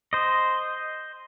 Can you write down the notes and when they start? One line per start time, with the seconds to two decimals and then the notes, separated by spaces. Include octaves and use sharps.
0.13 C5 D#5